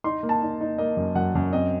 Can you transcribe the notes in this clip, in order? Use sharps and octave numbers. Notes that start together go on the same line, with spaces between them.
D#4 C6
A#3
A5
D#4
D#4
A#3 D#5
F#2
F#2 F#5
F#2
C4 D#5